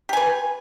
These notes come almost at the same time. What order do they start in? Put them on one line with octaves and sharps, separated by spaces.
G4 G#5 B4